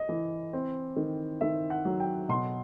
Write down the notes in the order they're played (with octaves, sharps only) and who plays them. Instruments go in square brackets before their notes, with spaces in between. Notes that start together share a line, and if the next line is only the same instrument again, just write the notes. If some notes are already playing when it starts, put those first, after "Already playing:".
Already playing: [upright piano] D#5
E3
C4
D#3
D#3 E5
F#5
F#3
G5
B2 C6